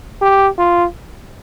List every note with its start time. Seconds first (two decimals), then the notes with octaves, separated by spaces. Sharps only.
0.22 G4
0.58 F4